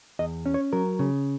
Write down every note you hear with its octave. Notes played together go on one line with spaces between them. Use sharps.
E2 D#5
C#4
C#5
F#3 A#4
C#3